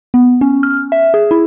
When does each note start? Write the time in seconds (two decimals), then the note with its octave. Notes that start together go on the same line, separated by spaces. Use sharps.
0.14 B3
0.41 C#4
0.63 F6
0.92 E5
1.14 G#4
1.31 E4